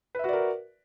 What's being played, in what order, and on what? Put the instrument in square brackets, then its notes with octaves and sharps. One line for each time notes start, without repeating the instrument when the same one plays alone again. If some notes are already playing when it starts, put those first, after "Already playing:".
[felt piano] B4
E5
F#4
D5
A#4